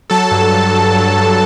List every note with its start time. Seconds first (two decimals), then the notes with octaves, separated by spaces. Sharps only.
0.10 F#3 A4 A5
0.31 G2
0.52 G2
0.74 F#3
0.94 F#3
1.16 G2